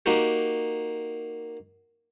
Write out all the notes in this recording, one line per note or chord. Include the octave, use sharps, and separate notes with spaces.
A#3 D#4 F#4 G4